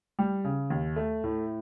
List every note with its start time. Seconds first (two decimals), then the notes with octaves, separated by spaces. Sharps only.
0.19 G3
0.44 C#3
0.70 D#2
0.96 A3
1.24 A2